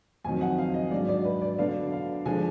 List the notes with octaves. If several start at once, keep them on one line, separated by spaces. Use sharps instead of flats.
F2 D#3 F#3 G#5
F#5
F5
D#5
G#2 F#3 D4 D5
D5
B4
D5
D3 F#3 B3 D4 F5
F5
D3 F3 G#3 D4 G#5